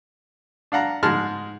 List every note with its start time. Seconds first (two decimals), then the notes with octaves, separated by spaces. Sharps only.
0.72 D4 F5 F#5 A#5
1.03 G#2 G#3 A5 F6